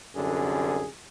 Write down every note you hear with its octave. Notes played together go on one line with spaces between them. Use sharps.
C2 F#2 D3 G#4